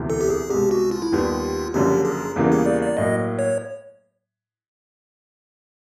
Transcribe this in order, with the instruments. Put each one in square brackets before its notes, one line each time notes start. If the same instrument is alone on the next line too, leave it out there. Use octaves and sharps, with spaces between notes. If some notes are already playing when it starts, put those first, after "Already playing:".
Already playing: [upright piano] E1 D2 C3 E3
[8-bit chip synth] A4
G4
G#4
[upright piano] C2 B2 G#3 [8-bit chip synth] G4
[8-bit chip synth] F#4
F4
E4
[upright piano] D#2 D#3 G3 B3 [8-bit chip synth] F4
[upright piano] F#1 F#2 D3 F3 [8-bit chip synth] G4
[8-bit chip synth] G#4
[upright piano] E2 C#3 E3 G3 A#3
[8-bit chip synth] G#4
D5
D5
[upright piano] A2 F#3 A#3 [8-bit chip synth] D#5
[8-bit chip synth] C#5